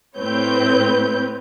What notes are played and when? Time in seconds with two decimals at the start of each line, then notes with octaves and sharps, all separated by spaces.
0.18 A2 C4 B4 C#5 G6